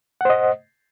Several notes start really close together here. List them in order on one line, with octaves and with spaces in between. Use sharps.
F#5 C5 D#5